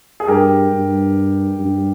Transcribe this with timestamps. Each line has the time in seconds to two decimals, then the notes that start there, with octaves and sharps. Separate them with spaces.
0.20 G#4
0.27 G2 G4 A#4
0.71 G2
1.59 G2